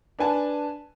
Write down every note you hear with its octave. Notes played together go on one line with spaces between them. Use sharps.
D4 B4 G#5 A5